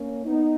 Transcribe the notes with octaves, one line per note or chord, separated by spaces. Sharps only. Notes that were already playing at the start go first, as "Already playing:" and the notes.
Already playing: A#3 C#4
B3 D#4